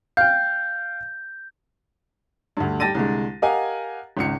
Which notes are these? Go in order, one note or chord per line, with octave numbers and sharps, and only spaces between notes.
F5 G5 G6
D2 G2
G3 G5 A5 A6 A#6 D#7
C2 D3 G#3
G4 A#4 D#5 F5 F#5 G#5
G#1 C#2 C#7